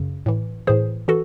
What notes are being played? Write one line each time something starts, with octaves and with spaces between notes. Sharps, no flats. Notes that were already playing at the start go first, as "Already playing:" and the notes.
Already playing: F#2 C#3
A2 E3
A2 E3 G#4 C5
E3 F#4 A4